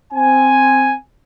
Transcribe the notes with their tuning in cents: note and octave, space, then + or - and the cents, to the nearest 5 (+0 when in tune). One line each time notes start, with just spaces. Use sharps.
C4 +0 G#5 +0